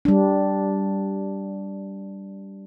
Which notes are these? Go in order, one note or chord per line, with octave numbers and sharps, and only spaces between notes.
G3 D4